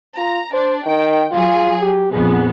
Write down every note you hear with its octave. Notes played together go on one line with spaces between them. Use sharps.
F4 A#5
D4 C5
D#3 G5
F#3 F4 G#4
G4
A#1 F2 B3 G#4